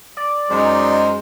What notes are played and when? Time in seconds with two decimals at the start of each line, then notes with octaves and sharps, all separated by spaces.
0.17 D5
0.50 F#2 G#3 D#4 C5